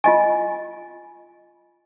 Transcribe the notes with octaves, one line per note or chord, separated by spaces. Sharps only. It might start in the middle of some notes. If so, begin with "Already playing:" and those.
F4 D#5 G#5